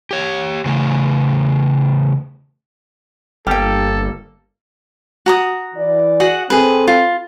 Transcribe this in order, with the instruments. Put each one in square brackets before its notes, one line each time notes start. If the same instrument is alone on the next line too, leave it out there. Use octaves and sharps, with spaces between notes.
[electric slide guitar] G4 C#5
C#3 E3 A3
[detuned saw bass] G1 [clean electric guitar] G3 A#3 [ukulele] G4 G5 [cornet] A4
[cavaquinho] F#4 A#5 D#6
[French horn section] E3 D5
[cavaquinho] F#4 G#4 F#5
[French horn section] C4 A4 [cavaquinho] G#4 B4
[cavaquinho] F4